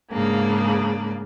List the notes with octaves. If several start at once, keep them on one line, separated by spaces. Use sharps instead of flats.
G#2 C#3 A#3 D4